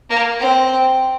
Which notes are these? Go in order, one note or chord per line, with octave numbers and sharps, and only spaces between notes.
A#3
C4